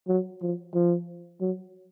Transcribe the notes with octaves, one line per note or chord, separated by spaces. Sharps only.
F#3
F3
F3
F#3